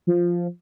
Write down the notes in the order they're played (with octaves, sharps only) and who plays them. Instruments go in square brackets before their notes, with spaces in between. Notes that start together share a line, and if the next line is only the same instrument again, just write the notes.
[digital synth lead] F3